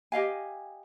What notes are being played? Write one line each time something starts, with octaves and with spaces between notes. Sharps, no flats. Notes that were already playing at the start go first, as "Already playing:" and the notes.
G4 D#5 F5 G#5